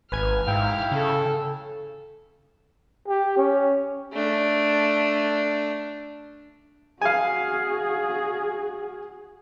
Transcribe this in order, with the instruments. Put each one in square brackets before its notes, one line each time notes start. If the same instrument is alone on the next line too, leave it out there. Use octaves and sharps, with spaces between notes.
[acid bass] G#1 [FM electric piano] B4 G#5 G#6 [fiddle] F6
[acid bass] G#2 [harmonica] E4 F5 [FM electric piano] G5
[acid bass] C#3 [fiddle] A4
[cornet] G4
C#4
[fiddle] A3 D4
[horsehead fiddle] F#4 G#4 [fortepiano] F5 G#5